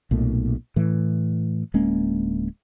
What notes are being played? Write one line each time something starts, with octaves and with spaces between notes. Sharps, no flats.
B1 A#2 A3
A2 E3
D1 G#3 A#3 C#4